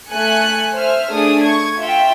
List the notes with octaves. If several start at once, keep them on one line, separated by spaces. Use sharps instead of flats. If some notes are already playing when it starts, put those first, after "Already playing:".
A3 G#5 F#6 C#7
C5 E5 F6
A3 D4 G#4 D#6
C#6 G#6
F4 E5 G5